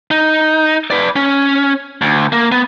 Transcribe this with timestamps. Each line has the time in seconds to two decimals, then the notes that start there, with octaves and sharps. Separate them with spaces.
0.11 D#4
0.90 B4 D5
1.16 C#4
2.02 D2
2.32 A#3
2.52 B3